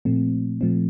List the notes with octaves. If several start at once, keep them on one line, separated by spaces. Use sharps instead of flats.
A#2 F3 A3 C4
A#2 F3 A3 C4